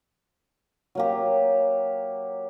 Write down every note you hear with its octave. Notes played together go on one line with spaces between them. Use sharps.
F#3 A#3 G4